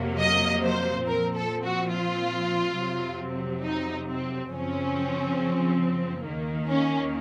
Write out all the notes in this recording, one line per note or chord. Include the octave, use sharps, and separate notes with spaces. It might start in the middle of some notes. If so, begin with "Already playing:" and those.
Already playing: F2 C3 F#3 A#3
D#5
C5
A#2 F3 C4 A#4
A4
F#4
F4
F2 C3 F#3 C4
D#4
C4
F#2 C#3 F3 C4 C#4
D#2 D#3 A#3
C#4